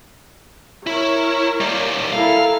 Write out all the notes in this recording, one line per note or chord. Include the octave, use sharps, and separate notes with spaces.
E4 A#4 C#5
G3 A#3
E4 A4 A#4 F5